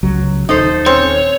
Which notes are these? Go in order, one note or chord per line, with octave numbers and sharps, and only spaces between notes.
C#2 F#3
D#1 D#4 A4 C5
C4 C#4 C#5